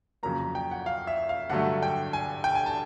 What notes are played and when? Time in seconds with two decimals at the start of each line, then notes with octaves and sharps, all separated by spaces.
0.23 F2 C#3 F#3 A#3 A#5
0.39 A#5
0.55 G5
0.71 F#5
0.86 F5
1.07 E5
1.29 F5
1.50 G2 D3 F#3 A3 F#5
1.83 G5
2.13 G#5
2.44 G5
2.55 G#5
2.66 A5